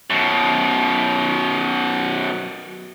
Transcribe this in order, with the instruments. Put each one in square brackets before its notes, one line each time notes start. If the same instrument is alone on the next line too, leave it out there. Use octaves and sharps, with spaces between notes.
[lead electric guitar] F#2 B2